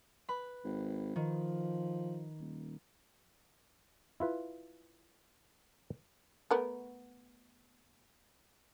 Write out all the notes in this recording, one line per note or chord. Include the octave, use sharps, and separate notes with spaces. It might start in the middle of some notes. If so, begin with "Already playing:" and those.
B4 B5
G#1
D#3 F3
D#1
E4 F4 B4
A3 B3 A#4